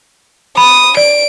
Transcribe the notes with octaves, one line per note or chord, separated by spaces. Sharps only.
B5 D#6
D5 D7